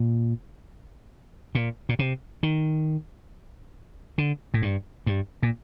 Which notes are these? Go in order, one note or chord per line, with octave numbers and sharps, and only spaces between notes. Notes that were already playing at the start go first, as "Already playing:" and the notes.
Already playing: A#2
A#2
A#2
C3
D#3
D3
A2
G2
G2
A#2